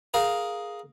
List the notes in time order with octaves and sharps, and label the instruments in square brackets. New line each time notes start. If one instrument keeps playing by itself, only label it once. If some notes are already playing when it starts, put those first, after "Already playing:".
[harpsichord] G#4 A#4 F5